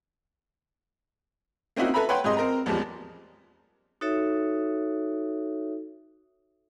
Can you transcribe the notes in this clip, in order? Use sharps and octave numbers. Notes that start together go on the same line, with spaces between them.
A#3 C4 C#4 D#4 E4 F#4
A4 B4 E5 A#5 B5
B4 C#5 F#5 G5 C6
G#2 C3 G#4 D#5 C6
C4 A#4 D#5 A#5
A1 E2 F3 G3 G#3
D#4 F#4 A4 C#5 E5